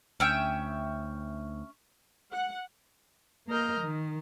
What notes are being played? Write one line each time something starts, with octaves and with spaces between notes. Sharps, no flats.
D2 C#4 E5 G5
F#5
A#3 A#4 D#5 F6 G6
D#3